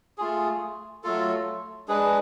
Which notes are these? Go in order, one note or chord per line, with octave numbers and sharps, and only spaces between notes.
A3 F4 G#4
F#3 A3 F4 A4
G#3 D4 G#4 B4